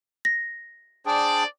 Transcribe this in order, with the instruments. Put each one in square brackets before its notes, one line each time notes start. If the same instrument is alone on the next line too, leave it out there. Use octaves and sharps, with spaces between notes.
[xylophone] A#6
[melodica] D4 G#4 G5 [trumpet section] C5 D5